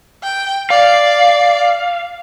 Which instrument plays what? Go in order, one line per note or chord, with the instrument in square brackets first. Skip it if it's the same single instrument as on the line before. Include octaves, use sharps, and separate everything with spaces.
[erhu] G5
[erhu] D5 [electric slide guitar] F5